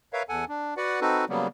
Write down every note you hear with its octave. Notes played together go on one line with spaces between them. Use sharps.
A#4 B4 C#5 E5 F5
E2 A4 F#5 G#5
D4
F#4 B4 D5 F#5
C4 D#4 F#4 A4 B4
C#3 F#3 G3 A#3 B3